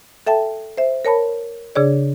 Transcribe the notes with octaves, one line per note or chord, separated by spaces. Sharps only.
A4 E5 G5 A5
C5 E5
A#4 C#5 A5 B5
C#3 D4 G#4 C#5 D5